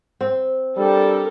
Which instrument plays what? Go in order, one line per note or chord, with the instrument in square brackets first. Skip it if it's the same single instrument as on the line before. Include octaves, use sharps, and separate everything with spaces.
[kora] C4
[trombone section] G3 D4 G4 [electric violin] A4 A#4